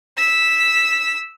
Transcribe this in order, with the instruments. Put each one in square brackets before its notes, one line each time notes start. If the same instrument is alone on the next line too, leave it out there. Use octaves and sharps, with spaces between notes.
[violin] E6 B6